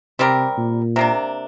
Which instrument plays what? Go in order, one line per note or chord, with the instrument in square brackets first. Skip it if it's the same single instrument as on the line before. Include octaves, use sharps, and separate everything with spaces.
[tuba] C3 [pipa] G3 C4 G4 A#4
[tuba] A#2
[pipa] C3 A#3 D4